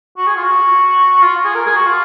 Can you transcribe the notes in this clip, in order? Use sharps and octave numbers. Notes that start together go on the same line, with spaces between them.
F#4
G#4
F4
F#4
F4
G#4
A#4
G#4
F#4
F4